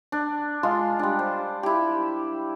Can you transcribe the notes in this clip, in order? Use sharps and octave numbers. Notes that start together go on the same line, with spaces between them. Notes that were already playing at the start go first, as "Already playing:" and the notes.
D4
G#3 F4 C6
G3 D4
C5
E4 G4